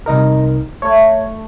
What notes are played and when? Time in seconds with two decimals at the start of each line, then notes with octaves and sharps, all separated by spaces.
0.06 C2 D#4 A#4
0.82 A3 C#5